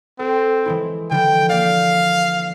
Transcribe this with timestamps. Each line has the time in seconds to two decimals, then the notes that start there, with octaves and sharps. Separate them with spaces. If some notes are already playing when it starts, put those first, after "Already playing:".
0.19 C4 A4
0.66 E3 G#3 E4
1.11 D3 F3 E4 G5
1.50 A#3 D5 F5